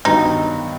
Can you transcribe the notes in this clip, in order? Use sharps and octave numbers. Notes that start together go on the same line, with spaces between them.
G2 D#3 F#3 B3 D#4